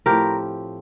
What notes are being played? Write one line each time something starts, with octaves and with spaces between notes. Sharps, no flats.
A2 F3 C4 G4 A#4